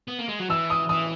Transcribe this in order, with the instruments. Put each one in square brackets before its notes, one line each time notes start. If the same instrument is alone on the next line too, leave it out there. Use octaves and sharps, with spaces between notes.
[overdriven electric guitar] B3
A#3
G#3
F#3
[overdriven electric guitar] E3 [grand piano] E6
[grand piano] D#6
[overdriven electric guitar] E3 [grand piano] D#6